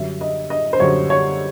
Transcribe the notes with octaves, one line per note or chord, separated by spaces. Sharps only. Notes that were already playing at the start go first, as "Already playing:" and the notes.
Already playing: F#2 D3 G3 E5
D#5
D#5
C5
F#2 D3 G3 C#5
C#5